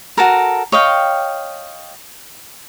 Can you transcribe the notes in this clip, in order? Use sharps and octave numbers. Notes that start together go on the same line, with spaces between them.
F#4 A4 A#4
C#5 D#5 F5 G5